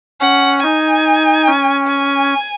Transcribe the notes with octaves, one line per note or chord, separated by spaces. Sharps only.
C#4 F#5
D#4 G#5
C#4
G#5